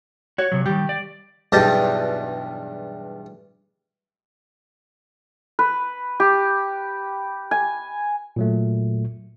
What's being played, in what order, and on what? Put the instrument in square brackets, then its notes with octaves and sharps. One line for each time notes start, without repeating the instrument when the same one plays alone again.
[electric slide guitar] F#4 [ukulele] C#5
[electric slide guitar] C3 F#3
[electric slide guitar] D#3 G3 [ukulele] G4
[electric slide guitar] D5
[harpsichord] B1 E2 G2 G4 D#5 A5
[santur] B4
G4
G#5
[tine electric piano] A#2 F#3 A3